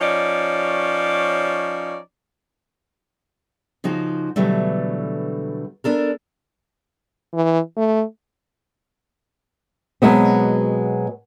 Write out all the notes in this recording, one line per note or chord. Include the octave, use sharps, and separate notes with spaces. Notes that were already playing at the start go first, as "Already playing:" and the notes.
F3 C#4 D#4 C#5 D5
C#3 F3 D#4 F#4 C5
B2 D3 E3 F#3 G3 A3
B3 D4 A4 A#4
E3
A3
B2 F#3 G#3 B3 C4